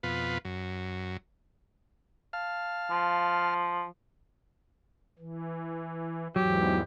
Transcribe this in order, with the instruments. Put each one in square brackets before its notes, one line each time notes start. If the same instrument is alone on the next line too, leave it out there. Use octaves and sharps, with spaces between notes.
[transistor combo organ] F2 B2 F4 B4
F#2
F5 A5 F6
[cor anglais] F3
[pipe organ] E3
[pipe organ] E2 G#2 E3 [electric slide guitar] F#3 [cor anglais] G4